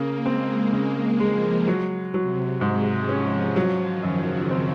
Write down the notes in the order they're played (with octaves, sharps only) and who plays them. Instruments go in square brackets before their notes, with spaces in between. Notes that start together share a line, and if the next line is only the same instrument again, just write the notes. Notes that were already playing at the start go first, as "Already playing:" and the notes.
Already playing: [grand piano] C#3 [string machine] A#3
[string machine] G#3 [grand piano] C4
[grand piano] C#3
[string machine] F3 [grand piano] G#3
[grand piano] F#3
[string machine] C3 [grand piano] F#3
[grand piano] G#2 [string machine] G#3
[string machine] F3 [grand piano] C#4
[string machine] F3 [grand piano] F#3
[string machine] D#3
[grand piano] F#2
[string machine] C#3
[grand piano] C4